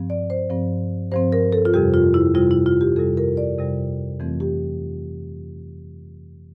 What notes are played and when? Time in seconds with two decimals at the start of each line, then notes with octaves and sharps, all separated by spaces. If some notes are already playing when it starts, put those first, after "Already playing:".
Already playing: G2 F3 C4
0.10 D5
0.30 C5
0.50 G2 F3 C4
1.12 G2 F3 C4 C5
1.32 A#4
1.52 A4
1.65 F4
1.74 F2 C3 G3 G4
1.94 F4
2.14 E4
2.34 F2 C3 G3 F4
2.51 E4
2.66 F4
2.81 G4
2.96 F2 C3 G3 A4
3.17 A#4
3.37 D5
3.58 F2 C3 G3
4.19 F2 E3 A3 C4
4.40 G4